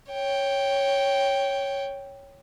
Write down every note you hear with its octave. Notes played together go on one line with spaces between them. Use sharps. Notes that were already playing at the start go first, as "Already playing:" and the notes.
C#5 G5